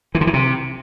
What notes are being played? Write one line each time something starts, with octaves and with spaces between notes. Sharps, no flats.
E3
D3
E3
C3